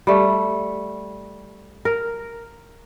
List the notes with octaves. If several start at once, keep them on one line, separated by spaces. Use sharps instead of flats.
G3 A3
A#4